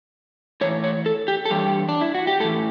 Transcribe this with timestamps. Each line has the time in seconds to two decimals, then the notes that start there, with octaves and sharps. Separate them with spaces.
0.61 A2 E3 C#5
0.84 C#5
1.06 A4
1.28 G4
1.45 A4
1.50 G2 E3 G4
1.89 D4
2.01 E4
2.14 F#4
2.27 G4
2.40 A2 A4
2.44 E3